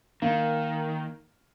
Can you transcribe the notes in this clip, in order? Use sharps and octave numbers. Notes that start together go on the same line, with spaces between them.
D#3 A#3